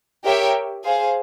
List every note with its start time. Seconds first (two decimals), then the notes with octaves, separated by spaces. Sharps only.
0.25 G4 A#4 C#5 E5 G5
0.84 G#4 C5 F5